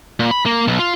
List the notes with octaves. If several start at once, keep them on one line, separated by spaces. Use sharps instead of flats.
A#2
B5
A#3
B1
F4